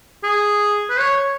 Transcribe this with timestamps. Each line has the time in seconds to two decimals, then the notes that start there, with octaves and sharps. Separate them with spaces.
0.23 G#4
0.90 B4
0.99 C#5